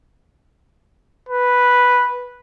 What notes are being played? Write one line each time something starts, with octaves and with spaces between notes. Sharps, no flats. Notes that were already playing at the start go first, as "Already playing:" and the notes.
B4